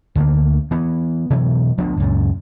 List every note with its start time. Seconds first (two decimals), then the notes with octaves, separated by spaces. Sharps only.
0.15 D2 D3 F3 A#3
0.71 E3 B3
1.30 B2 E3 F#3
1.78 D2 F3 B3 D4
1.97 C#2 F#2 A#2